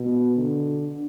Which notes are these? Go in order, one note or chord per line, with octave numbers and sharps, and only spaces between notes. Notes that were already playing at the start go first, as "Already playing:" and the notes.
Already playing: B2
D3